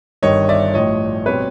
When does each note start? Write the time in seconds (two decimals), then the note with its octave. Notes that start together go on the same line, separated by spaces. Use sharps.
0.22 G1 G2 D#3 C#5 D#5
0.49 D5 E5
0.74 A1 A2 F3 C#5 D#5
1.26 B2 G3 C4 B4 C#5